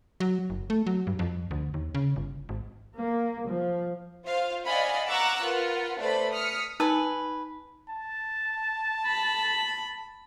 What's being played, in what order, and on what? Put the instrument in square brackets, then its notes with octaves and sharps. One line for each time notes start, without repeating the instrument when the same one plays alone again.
[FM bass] F#3
F#1
A3
F#3
G2
F2
D2
D#2
C#3
G1
G#1
[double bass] A#3
F3
[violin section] F4 C5 F5
D5 D#5 F5 F#5 G#5 B5
F#5 A#5 C#6 D6 E6 F#6
F4 A#4 B4 F#5
A3 B4 C5 D5 B5
D#6 F6 B6 C#7
[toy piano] D#4 A5 E6 [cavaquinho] B4 G#5
[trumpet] A5
[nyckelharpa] B5